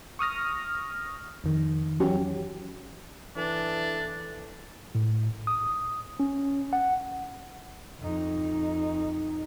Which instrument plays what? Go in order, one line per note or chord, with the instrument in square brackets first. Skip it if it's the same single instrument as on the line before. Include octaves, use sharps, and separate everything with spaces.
[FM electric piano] C#6 D#6 F6 A#6
F2 D#3
E3 F#3 C#4 F#4 G4
[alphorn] E3 [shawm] D4 [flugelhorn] A4
[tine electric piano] A2
D#6
C#4
F#5
[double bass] F2 D#4